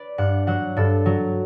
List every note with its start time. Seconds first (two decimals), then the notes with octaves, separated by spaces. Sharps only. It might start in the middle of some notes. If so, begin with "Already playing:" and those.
Already playing: B4 D5
0.18 G2 F#5
0.47 F#3 F#5
0.77 G2 A4
1.06 F#3